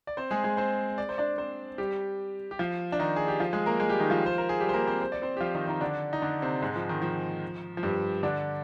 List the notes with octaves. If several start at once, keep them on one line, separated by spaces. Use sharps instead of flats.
D5
C4 C5
G#3 G#4
G#3 G#4
C4 C5
D5
C5
D4 D5
C4 C5
G3 G4
G4
F3 F4
D4
D#3 D#4
G#4
G4
F3 F4
G#3 G#4
A#3 A#4
G#3 G#4
G3 G4
D#3 D#4
F3 F4
C5
A#4
G#4
G3 G4
C5
A#3 A#4
C4 C5
C5
D5
C4 C5
G4
F3 F4
D#3 D#4
D#3 D#4
D3 D4
D#4
D3 D4
C3 C4
G#2 G#3
F3
D#3
F3
F3
G2 G3
D3 D4